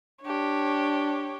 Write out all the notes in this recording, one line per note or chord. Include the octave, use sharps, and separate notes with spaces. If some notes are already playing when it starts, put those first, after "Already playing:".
D4 G4 C#5